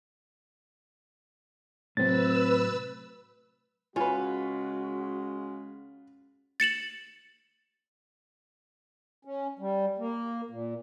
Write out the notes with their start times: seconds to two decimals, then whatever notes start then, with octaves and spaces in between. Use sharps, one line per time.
1.97 A2 C3 F#3 C4 B4 E6 A6
3.96 C#3 G#3 C#4 F4 F#4 B4
6.60 A6 C#7 E7 F#7
9.25 C#4
9.59 G3
9.98 A#3
10.50 A#2